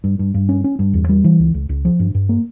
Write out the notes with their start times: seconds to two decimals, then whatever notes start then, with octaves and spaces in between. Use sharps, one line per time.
0.04 G2
0.19 G2
0.34 G2
0.49 C#4
0.64 C#4
0.79 G2
0.94 E2
1.09 G3
1.24 E3
1.39 C#2
1.54 C#2
1.69 C#2
1.85 F3
2.00 G2
2.15 G2
2.29 A#3